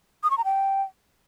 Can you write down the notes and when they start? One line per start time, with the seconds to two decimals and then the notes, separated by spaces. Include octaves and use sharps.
0.23 D#6
0.31 C#6
0.38 A#5
0.45 G5